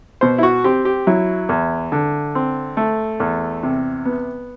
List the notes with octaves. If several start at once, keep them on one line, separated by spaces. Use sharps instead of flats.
B2 C5
E4
F#4
C4 G4
G4
F#3 E4
E2
D3
C4
A3
E2
C3
B3